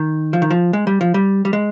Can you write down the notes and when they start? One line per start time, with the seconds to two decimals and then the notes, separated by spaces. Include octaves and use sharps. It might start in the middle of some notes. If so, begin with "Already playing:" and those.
Already playing: D#3
0.33 F3
0.42 D#3
0.51 F3
0.73 G#3
0.87 G3
1.01 F3
1.14 G3
1.45 G3
1.53 G#3